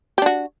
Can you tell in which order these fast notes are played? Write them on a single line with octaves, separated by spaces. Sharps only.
G4 D4 F#4